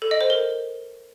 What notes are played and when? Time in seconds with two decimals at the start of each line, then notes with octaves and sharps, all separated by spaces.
0.02 A4
0.11 D#5
0.21 C5
0.30 A#4